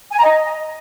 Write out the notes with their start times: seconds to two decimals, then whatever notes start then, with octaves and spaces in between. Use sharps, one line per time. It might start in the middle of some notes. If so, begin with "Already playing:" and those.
0.11 G#5
0.18 A#5
0.25 D#5